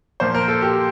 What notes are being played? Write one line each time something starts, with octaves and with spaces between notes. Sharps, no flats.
A#2 F3 A#3 C5
A#4
A4
G4